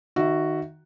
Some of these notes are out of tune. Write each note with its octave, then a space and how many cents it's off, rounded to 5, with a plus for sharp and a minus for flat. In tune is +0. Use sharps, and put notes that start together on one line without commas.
D#3 -5 F#4 +0 E5 +20